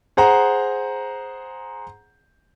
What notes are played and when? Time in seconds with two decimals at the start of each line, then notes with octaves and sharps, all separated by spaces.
0.17 G#4 C5 F#5 A#5